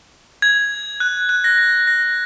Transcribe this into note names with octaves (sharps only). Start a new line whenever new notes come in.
G#6
F#6
F#6
A#6
A#6
A#6